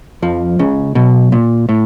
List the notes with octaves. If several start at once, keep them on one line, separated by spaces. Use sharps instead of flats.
F2 F3
C#2 C#3
B1 B2
A#2
A2